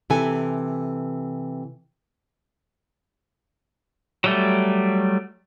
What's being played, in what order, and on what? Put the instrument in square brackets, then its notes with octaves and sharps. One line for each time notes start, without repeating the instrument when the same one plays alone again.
[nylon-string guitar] C3 E3 A4 G#5
[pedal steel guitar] F#3 G3 A3